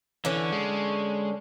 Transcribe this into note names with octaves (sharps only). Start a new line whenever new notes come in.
D3 E3 C#4
G#3